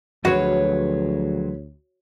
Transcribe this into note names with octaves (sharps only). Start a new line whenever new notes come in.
D2 F3 F#3 F#4 G#4 B4 C#5